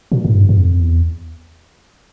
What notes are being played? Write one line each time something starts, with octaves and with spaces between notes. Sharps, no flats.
A#2
G#2
G2
G2
F2
E2